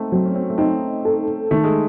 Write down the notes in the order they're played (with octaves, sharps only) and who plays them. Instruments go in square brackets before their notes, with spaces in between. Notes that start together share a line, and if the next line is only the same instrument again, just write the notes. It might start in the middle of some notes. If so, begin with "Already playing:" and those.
Already playing: [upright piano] A3 C4 D#4
[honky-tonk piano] F#3 [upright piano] C4
[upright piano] C#4
C4
A3
[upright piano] C4 [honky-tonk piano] D#4
[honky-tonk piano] A4
[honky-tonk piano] D#3 [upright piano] A3
[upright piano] G#3